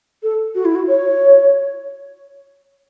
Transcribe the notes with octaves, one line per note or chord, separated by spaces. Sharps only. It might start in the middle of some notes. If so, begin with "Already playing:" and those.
A4
F#4
E4
F#4
C#5